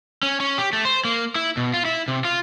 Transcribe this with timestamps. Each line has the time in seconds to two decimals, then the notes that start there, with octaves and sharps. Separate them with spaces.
0.23 C#4
0.40 C#4
0.58 G4
0.73 A3
0.85 C5
1.05 A#3
1.35 E4
1.57 B2
1.74 F4
1.85 E4
2.08 C3
2.25 F4